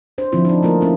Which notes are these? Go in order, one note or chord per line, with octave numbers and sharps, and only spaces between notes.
D4 C5
D3 F3 C4 E4 F4
D4 D#4
A3 A#3 F4 A#4
C#4 E4 F4